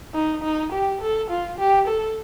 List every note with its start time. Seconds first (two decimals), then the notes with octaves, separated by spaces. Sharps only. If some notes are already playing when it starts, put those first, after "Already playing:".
0.14 D#4
0.43 D#4
0.72 G4
1.01 A4
1.30 F4
1.59 G4
1.87 A4